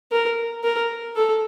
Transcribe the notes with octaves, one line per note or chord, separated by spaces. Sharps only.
A#4
A#4
A4